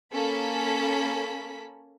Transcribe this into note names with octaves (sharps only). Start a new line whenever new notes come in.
A#3 C#4 A4 B5 B6